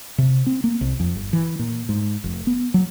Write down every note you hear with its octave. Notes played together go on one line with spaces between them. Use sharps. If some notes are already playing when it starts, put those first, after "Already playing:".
C3
C4
A#3
C2
F2
G1
E3
A#2
G#2
F1
B3
F#3